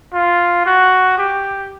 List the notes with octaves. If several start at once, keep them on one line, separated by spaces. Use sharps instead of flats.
F4
F#4
G4